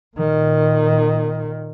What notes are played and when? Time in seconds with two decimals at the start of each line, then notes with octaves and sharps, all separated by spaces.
0.17 A#2 D#3